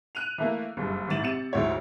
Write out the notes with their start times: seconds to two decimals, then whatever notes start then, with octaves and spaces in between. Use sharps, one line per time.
0.15 F#6 D#7 F7
0.38 E3 A3 A#3
0.77 F#1 G2
1.08 A1 G#2 E3 A6 E7 F#7
1.22 C3 C#7 E7
1.53 F1 D2 G#2 E4 C#5